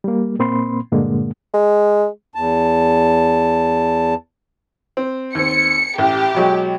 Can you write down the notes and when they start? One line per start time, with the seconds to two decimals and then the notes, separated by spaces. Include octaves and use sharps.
0.04 G3 A#3
0.39 A#2 A#3 C4 B5 C6
0.92 G2 A#2 D3 G#3 A#3
1.54 G#3
2.35 E2 A5
4.97 C4
5.35 D#2 C4 C#7
5.98 A1 G4
6.34 B2 F#3 G#3